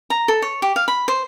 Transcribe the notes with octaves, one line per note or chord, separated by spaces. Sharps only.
A#5
A4
C#5
G4
F5
B5
C5